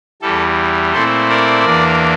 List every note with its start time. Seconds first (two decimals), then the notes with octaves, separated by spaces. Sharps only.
0.22 E2 E3 G3 A4
0.93 A#2 A3 C4 E4 A4 C5
1.29 A#4 D5
1.65 E2 E3 A#3 D4